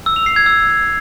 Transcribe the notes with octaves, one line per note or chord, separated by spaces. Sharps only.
E6
F7
C7
G#6
E6